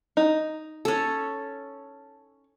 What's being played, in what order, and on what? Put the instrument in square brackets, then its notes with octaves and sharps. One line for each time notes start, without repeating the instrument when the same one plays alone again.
[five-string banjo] D#4
[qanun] C#4 A4